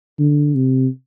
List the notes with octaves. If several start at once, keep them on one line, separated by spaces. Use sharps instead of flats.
D3
C3